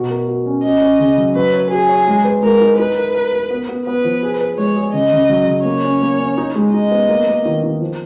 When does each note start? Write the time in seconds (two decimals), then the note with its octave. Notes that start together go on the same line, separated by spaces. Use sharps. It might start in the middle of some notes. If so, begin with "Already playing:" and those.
Already playing: B2 F#4
0.10 A#4
0.28 F#4
0.46 C#4
0.64 C#4 D#5
0.81 C#4
1.00 C#3
1.18 F#3
1.35 F#3 B4
1.53 C#5
1.71 F#4 G#4
1.89 C#5
2.07 G#3
2.25 B4
2.43 G#3 A#4
2.61 D#4
2.79 D#4 B4
2.97 A#4
3.14 A#4
3.32 A#4
3.51 B3
3.69 B3
3.86 B3 B4
4.04 F3
4.23 G#4
4.41 B4
4.58 G#3 C#5
4.76 G#4
4.94 C#3 D#5
5.13 C#3
5.29 F#3
5.47 C#3
5.65 A#3 C#5
5.84 C#4
6.02 A#3
6.19 C#4
6.37 D#4
6.56 G#3
6.73 D#4 D#5
6.91 B3
7.09 A#3
7.28 A#3
7.45 D#3
7.63 D#3
7.81 F3